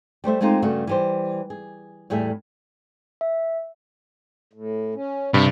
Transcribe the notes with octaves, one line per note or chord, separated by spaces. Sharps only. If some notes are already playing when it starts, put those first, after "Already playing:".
G3 A3 C5 E5
G#3 A3 C4 D#4 F4 G4
G2 C#3 A3 F#4
E3 G3 C5
G#4
E2 A2 G3 G#4 E5
E5
A2
C#4
G2 C3